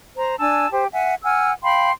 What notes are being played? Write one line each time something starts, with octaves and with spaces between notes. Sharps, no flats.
C5 A#5
D4 G#5 A5 E6
G4 C5
E5 F#5 G#5
F#5 G#5 E6 F6
F5 G5 B5 C6